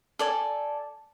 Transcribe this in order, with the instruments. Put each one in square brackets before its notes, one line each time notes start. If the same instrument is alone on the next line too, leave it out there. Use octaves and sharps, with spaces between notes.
[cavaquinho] A4 D5 G#5